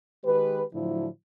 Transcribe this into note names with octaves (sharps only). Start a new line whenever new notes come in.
D#3 G#3 G4 B4
A2 D3 F3 F#3 E4